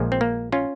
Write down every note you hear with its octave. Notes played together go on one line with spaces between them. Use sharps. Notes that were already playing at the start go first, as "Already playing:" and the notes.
Already playing: A#1 A#2 F3 G#3
C4
A#3
C#4 F4